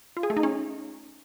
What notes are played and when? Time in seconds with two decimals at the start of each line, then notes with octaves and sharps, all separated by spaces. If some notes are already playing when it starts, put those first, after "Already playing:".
0.17 F4
0.23 G#4
0.30 A3
0.37 D#4
0.43 C#4